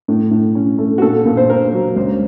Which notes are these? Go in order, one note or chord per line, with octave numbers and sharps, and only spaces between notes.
A2
A2
C#4
A3
F#4
A#2 A4
A#2
C5
A#3 A#4
F#3
C#2 C5